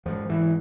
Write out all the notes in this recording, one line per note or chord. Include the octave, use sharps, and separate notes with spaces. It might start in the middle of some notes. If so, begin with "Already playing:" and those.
G#2 F3
E3